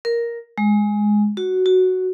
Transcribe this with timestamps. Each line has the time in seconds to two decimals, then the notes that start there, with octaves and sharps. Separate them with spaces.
0.05 A#4
0.58 G#3
1.37 F#4
1.66 F#4